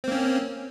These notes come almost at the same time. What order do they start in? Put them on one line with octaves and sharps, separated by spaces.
C4 A#3 C#4